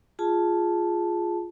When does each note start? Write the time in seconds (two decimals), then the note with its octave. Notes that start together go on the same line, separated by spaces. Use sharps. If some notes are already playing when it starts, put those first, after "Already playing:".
0.19 F4 G#4 A5